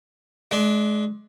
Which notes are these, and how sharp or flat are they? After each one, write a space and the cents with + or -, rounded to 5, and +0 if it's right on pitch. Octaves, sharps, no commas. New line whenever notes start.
G#3 +35 D4 +0